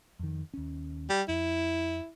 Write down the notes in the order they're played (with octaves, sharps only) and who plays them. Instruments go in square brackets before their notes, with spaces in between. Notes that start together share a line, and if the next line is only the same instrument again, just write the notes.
[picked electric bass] F2 D#3
D#2 C#4
[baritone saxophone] G3
[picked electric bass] F2 [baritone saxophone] E4